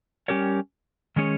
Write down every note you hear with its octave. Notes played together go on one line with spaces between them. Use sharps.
G3 C#4 G4 A#4 C#5
D#3 G#3 C#4 G#4 C#5